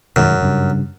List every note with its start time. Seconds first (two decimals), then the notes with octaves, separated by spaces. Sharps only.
0.16 F#2 B2 D#3 G#3
0.42 G2 C#3